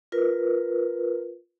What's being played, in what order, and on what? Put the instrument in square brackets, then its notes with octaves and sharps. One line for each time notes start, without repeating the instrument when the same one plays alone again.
[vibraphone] F4 A#4 B4